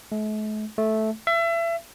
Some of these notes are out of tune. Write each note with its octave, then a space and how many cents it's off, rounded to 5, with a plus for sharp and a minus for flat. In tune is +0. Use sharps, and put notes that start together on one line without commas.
A3 -45
A3 -10
E5 +30